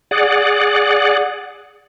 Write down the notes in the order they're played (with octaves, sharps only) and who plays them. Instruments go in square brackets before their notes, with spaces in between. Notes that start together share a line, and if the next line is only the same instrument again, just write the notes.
[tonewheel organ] G#4 D5 F#5